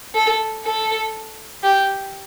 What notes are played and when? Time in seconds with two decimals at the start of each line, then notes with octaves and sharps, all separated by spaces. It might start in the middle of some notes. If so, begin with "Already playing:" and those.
0.15 A4
0.65 A4
1.63 G4